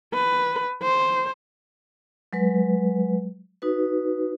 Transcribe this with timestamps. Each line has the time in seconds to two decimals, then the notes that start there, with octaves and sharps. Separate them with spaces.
0.14 B4
0.83 C5
2.33 F#3 G#3 B4
3.62 D#4 F#4 B4